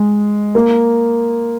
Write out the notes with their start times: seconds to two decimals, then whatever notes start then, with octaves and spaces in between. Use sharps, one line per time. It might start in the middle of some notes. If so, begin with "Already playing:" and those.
Already playing: G#3
0.55 A#3